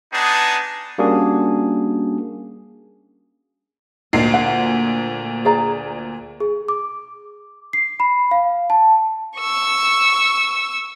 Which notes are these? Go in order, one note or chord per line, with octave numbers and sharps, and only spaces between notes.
B3 D4 D#4 G#4 A5
G3 A#3 C#4 D4 F#4 G#4
D2 A#2 D#5 C7
F#5
G#4 D5 A#5
G#4
D6
C7
B5
F5
A5
C#6 E6